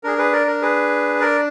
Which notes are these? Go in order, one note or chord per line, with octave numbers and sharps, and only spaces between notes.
D4 G#4 A#4
G#4 B4
A#4 D5
A#4
G#4 B4
A#4 D5